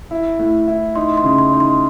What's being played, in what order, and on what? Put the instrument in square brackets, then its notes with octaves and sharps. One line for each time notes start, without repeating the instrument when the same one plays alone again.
[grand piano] E4
A2
E4
[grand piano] D#4 [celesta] C6
[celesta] C6
[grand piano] C#3
[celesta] C6
[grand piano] D#4
[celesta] C6